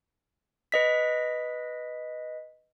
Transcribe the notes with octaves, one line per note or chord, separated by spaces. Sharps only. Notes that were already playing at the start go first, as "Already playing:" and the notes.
B4 D#5 B6